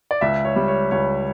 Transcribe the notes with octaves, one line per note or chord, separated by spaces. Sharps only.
D5
C#2 E5
C#5
G3
C#5
C#2 C#5